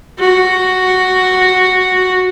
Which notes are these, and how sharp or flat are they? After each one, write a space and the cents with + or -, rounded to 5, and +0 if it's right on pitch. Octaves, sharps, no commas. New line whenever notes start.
F#4 +0